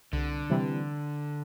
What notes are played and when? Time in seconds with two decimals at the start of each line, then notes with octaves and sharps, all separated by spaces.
0.13 C2 D3
0.50 C3 E3 G3